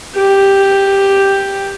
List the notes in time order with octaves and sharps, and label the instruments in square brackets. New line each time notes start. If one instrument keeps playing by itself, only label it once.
[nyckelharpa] G4